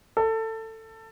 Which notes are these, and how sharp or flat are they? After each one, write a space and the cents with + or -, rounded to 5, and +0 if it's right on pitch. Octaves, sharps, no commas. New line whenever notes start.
A4 +20